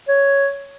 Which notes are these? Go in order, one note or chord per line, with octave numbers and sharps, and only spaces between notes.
C#5